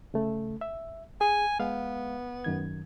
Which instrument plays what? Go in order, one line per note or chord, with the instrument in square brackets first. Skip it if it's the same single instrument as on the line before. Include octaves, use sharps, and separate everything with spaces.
[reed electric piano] C#3 A3
E5
[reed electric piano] G#4 [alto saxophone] G#5
[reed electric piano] G#3 F5 [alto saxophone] B3
[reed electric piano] F#2 D#3 G#6